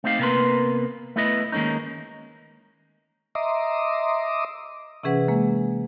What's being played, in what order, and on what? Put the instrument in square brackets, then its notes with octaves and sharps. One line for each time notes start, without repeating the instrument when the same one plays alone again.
[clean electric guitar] A3 C4 D#4 G4 F5
C3 A#3 B3 A#4 B4 C6
A3 B3 E4 B4 D#5
D#3 G#3 A#3 C#4 D#4
[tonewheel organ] D#5 E5 A#5 C6 D6 D#6
[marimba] C3 E3 C#4 G#4 B4 F#5
G#3 A#3